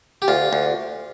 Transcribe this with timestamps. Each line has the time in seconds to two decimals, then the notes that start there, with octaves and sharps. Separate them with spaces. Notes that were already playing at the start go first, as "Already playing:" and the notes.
0.22 G4
0.28 D2 F4
0.53 D2